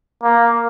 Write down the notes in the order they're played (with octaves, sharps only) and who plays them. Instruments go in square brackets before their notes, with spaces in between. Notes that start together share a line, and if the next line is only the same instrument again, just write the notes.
[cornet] A#3